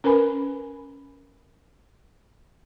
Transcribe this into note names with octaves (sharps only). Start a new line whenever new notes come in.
C#4 A#4 B4 G#5 B5